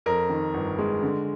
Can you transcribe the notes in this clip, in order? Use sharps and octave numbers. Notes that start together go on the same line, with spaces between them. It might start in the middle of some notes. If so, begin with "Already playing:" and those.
F2 A#4
D#3
G1
G#3
D3